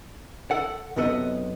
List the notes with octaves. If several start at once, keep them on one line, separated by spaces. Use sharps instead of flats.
A4 F#5
B1 F#2 C3 B3 A4 D#5